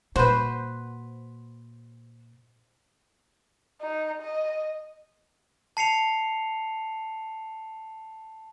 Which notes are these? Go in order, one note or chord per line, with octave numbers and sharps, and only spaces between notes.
A#2 F#4 B4 C5
D#4
D#5
A5 C7 C#7 F7